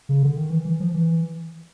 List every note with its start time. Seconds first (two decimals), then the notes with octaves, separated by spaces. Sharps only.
0.09 C#3
0.23 D3
0.37 D#3
0.50 E3
0.65 E3
0.80 F3
0.94 E3